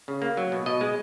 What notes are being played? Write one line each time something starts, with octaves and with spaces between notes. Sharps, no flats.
C#3
A#3
F#3
B2
B2 D#5
G#3